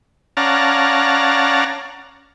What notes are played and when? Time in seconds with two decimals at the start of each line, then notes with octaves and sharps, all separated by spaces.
0.37 C#4 D5 F5 F#5 A5 A#5